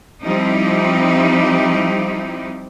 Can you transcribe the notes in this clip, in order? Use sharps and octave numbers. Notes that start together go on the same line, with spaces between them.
F3 G3 C4 D#4 E4 G4